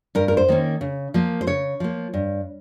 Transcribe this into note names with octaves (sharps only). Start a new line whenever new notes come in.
G2 A#4
A#4
C5
D#3 A#3 C#4
C#3
F3 A#3
C5
C#3 C#5
F3 A#3
G2